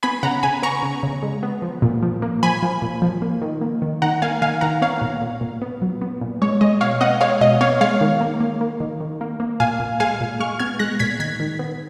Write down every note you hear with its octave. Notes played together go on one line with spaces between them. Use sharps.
B3 G#5 B5
C#3 F#5 A#5
C#3 G#5 B5
B3 A#5 C#6
C#3
C#3
G#3
B3
F3
A#2
F3
A#3
F3 G#5 B5
F3
A#2
F3
A#3
D#3
A#3
D#3
D#3 F#5 A#5
A#3 F5 G#5
D#3 F5 G#5
D#3 F#5 A#5
B3 C#5 F5
A#2
A#2
A#2
B3
F#3
B3
A#2
G#3 C#5
G#3 D#5
B2 C#5 F5
B3 D#5 F#5
G#3 C#5 F5
B2 D#5
B3 C#5 F5
G#3 C#5 F5
D#3
A#3
A#3
A#3
D#3
D#3
A#3
A#3
A#2 F5 G#5
A#2
G#3 F5 G#5
A#2
G#3 C#6 F6
B3 F6 G#6
G#3 F#6 A#6
A#2 G#6 B6
D#3 G#6 B6
D#3
B3